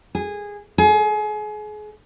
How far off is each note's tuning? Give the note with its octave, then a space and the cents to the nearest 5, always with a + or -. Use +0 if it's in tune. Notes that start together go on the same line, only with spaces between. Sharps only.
G#4 -15
G#4 +30